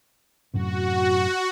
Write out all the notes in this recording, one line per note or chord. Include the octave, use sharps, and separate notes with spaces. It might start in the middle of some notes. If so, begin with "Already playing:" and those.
F#2 A2 C3 F#4